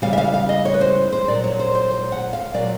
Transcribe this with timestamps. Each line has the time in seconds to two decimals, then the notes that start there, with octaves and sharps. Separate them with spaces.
0.02 C#3 E3 G3 F5
0.13 E5
0.18 F5
0.34 F5
0.49 D#5
0.65 C#5
0.74 B4
0.81 C5
1.12 C5
1.28 A#2 F#3 D5
1.44 C#5
1.59 C5
1.75 C5
1.91 C5
2.12 F#5
2.33 F5
2.54 A#2 F#3 D5